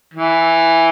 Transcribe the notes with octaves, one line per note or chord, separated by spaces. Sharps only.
E3